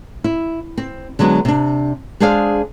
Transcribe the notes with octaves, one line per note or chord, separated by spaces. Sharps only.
E4
C4
D3 F#3 G#3 B3 D4
C3 D4
G#3 D4 G#4 C5 D5 F5